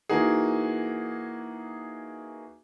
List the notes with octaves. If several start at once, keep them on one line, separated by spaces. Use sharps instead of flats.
E3 A#3 D#4 F#4 G#4